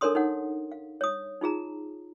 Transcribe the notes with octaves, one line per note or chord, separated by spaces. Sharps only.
D4 A4 A#4 C#5 C6 D#6
D#4 C#5 F#5
F5
C#5 D#6
D#4 F4 G#4 A#5